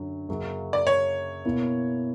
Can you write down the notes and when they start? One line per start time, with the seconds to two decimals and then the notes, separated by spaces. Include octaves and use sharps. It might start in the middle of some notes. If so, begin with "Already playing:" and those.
Already playing: F#2 D3 F#3 C#4
0.29 F#2 C#3 F#3 A#3
0.73 D5
0.87 C#5
1.45 B2 A#3 E4